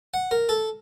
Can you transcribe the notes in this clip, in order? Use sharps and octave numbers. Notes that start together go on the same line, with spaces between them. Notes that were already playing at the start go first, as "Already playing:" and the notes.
F#5
A#4
A4